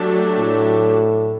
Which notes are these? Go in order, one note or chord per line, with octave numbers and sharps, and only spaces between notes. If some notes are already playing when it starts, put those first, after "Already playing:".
Already playing: F#3 A3 D4 G4
A2